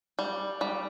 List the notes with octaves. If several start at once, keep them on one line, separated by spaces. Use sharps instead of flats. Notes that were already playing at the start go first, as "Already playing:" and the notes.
G3
G3